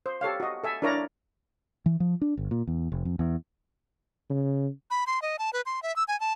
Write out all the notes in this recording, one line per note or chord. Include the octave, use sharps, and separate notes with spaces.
C5
G4 A4 C#5 F5
F#4 D#5
A4 E5 G#5
D4 E4 A#4 C#5 D5 A#5
E3
F3
D4
G1
A#2
E2
F1
F2
E2
C#3
B5
C6
D#5
A5
B4
C6
E5
E6
G#5
A5